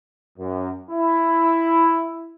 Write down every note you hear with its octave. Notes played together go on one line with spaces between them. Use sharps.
F#2
E4